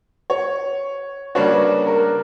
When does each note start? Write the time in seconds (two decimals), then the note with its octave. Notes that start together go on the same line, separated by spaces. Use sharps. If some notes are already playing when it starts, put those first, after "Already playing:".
0.30 C#5
1.35 C#3 G3 A#3 D4 F#4 C#5
1.53 B4
1.87 A#4